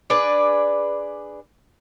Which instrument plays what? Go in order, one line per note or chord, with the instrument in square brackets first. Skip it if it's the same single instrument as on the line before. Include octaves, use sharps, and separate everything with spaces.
[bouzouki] D4 G#4 B4 D5